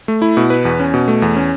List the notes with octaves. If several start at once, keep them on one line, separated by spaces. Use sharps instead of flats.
A3
E4
B2
B4
E2
C#4
B2
A3
E2
C#4